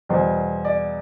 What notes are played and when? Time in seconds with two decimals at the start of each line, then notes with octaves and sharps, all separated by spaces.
0.09 E2 B2 G3 C5
0.65 D5